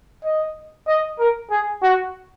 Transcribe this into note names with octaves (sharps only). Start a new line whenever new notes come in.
D#5
D#5
A#4
G#4
F#4